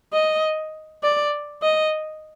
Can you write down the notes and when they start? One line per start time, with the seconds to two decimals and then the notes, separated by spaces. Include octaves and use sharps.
0.13 D#5
1.03 D5
1.63 D#5